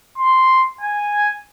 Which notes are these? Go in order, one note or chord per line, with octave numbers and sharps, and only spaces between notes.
C6
G#5